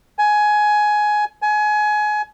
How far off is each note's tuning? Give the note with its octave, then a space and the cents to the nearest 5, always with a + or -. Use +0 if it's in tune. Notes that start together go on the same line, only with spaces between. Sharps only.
G#5 +15
G#5 +25